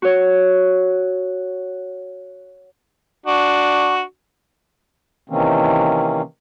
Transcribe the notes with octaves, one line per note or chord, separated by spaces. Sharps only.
F#4 C#5
D4 F#4
C3 D#3 E3 A#3 C4 C#4